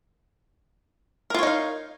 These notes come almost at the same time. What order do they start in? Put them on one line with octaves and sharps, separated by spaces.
A#4 F4 C#5 D#4 F5